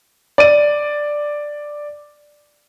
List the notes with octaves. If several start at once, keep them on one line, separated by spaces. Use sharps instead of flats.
D5 D#7